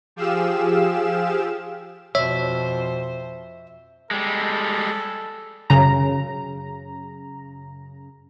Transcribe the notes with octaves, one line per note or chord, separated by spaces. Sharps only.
F3 G4 G#4 F5 E6 E7
F2 B2 C5 C#5 E5
G3 G#3 A4
F#2 C#3 A#5